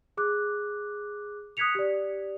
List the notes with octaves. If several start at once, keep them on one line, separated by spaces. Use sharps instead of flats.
G#4 D6 F#6
D#6 F#6 G#6 B6 C#7 F7
G4 D5